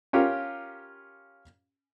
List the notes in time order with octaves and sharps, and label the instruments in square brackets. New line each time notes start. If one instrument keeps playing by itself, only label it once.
[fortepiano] C#4 F4 G4 A#4